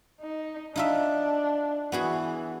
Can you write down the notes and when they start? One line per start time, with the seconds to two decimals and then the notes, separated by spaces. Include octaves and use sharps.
0.21 D#4
0.76 D4 D#4 F4 E5
1.92 E3 B3 F#4 G#4